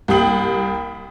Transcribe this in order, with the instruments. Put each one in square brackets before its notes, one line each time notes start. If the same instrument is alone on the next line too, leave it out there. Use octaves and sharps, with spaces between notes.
[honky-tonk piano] C2 A#3 G4 G5 D#6 F#7